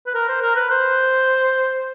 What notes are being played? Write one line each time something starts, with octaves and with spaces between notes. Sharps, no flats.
B4
A#4
C5
A#4
B4
C5